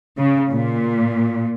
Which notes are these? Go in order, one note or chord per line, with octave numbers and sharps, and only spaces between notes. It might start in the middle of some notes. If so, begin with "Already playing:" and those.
C#3
A#2